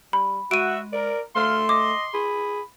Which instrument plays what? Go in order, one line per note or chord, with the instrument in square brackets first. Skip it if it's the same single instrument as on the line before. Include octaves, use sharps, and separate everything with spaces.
[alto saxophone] G3 [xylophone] B5
[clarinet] G#3 [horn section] F#4 [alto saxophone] E5 [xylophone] D7 D#7
[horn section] A#4 [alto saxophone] D5
[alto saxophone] A3 [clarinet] F5 [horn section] C6
[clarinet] D#5 [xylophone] D6
[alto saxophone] G#4 [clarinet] B5